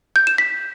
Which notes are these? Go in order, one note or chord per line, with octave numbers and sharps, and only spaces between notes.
G6
E7
B6